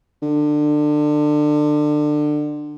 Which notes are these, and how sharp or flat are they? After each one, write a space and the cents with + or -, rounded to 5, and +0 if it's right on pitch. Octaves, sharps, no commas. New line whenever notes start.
D3 +25